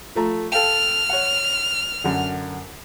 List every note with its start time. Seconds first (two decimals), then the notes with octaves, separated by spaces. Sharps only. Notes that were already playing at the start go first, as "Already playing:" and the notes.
0.15 F3 A3 A#5
0.52 A4 F5 G5 F6
1.09 C#5 F#5
2.04 F#2 D3